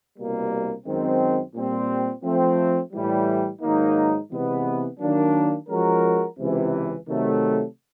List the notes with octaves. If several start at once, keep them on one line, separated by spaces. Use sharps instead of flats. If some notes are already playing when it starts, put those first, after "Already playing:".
C2 B2 G3 A#3
F#2 D#3 G#3 C4
A#2 G3 C4
F3 A3 C4
A2 E3 G3
G#2 D#3 F#3 A#3 D#4
C3 E3 G#3 B3
D#3 F#3 A#3 D4
F3 G#3 C#4 F#4 A#4
C#2 C3 E3
C3 D#3 F#3 A3